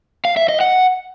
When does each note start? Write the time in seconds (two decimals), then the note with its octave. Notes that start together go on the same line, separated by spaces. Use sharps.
0.25 F5
0.37 E5
0.49 D#5
0.61 F#5